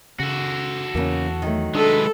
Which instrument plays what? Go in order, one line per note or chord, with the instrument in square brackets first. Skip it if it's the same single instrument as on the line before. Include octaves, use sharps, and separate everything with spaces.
[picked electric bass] C#3 [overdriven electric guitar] F#4 A4
[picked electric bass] E2 E3 [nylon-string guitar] C#3 A#3
[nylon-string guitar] D#3 F#3 A3
[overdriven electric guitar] G#3 B4 [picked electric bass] D4 [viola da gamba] A4